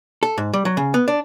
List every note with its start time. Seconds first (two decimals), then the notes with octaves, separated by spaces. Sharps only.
0.23 A4
0.38 G#2
0.53 G3
0.65 F#3
0.77 C#3
0.94 B3
1.08 D4